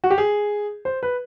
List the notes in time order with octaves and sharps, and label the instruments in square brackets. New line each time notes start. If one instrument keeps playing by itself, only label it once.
[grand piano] F#4
G4
G#4
C5
B4